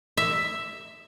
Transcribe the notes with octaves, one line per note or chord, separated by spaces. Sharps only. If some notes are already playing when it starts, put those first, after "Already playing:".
E5